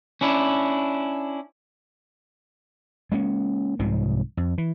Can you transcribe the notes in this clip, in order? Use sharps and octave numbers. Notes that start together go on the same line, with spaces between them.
C#4 D4 E4
G#3 A#3 C#4
C2 G#2 C3 F3
F2
E3